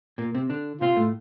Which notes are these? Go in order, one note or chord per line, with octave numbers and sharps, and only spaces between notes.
A#2 A#3
C3 C4
D3 D4
C3 C4 F4
A2 A3